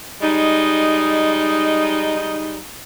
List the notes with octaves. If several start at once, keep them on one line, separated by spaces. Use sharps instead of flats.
G3 G#3 D#4